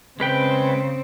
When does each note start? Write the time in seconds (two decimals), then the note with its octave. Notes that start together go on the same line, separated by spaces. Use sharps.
0.20 C#3 G#3 C4 B4 G5